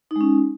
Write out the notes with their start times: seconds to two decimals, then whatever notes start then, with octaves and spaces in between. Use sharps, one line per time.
0.11 D#4
0.16 G#3
0.21 C#4